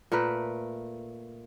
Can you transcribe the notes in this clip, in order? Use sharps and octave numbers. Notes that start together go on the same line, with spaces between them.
A#2 A3 A#4 B4